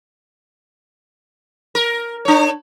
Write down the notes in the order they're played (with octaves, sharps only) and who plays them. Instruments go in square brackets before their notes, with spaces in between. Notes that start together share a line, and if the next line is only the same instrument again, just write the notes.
[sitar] A#4
D4 C#5